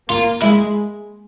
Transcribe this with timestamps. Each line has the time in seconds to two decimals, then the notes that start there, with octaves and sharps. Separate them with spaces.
0.09 A#3 F4
0.42 G#3 E4